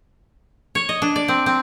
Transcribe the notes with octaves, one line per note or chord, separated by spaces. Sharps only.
C#5
D#5
D4
D5
C4
C4